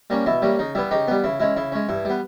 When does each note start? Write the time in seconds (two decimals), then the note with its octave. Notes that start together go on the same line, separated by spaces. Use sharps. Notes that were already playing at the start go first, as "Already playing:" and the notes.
0.10 G3 A#3 C#4
0.26 B2 E4
0.42 G3 A#3 C#4
0.59 C#3 D#4
0.75 G3 B3 E4
0.91 C#3 D#4 G4
1.07 G3 B3
1.24 C#3 E4
1.40 G#3 C#4 E4
1.56 C#3 E4
1.72 G#3 C#4
1.89 G2 E4
2.05 G3 B3